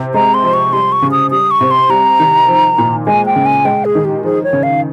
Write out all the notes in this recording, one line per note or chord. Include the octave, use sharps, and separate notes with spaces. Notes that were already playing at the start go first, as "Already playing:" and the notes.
Already playing: C3
G#3 A#5
C6
F3
C#6
G3 C6
C#6
C#3
D#6
G3 D#6
C#6
C3
C6
G3 A#5
D#3
F3
A#2
G#3 G#5
G5
C#3
G#5
G#3 G5
G#4
D#3
G4
F3 G#4
C#5
C#3
F5